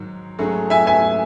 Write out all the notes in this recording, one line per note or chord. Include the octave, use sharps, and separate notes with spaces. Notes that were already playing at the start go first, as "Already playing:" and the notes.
Already playing: G#2 D#3 F#3
G#2 F#3 A3 C#4 G#4
E5 G#5
E5 G#5